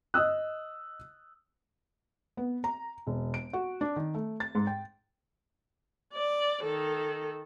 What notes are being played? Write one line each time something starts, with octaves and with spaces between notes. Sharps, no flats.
D#5 D#6 E6 F#6
B3
A#5
E1
D7
F#4
D4
D#3
A3
A6
G#2
G5
D5
D#3 A4